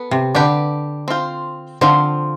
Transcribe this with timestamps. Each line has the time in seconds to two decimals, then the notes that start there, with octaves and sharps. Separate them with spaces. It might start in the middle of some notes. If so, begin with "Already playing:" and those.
Already playing: B3 A4
0.11 C3
0.35 D3 D4 G4 B4 D5
1.08 C4 F4 C5
1.81 D3 F3 C4 F4 C5